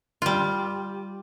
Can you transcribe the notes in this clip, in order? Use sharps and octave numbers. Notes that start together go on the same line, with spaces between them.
G3 F4